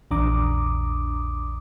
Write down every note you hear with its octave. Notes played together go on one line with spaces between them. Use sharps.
A#1 E2 D4 A#5 D6 D#6